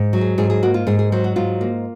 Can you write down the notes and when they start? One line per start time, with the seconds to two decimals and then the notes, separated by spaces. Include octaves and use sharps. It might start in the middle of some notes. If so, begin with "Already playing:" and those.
Already playing: G#2
0.13 F#3
0.21 G#4
0.38 G#2 G#4
0.50 G#4
0.63 A#3 F#4
0.74 F4
0.87 G#2 G#4
0.99 G#4
1.12 F#3 C5
1.24 F#4
1.36 G#2 F4
1.61 A#3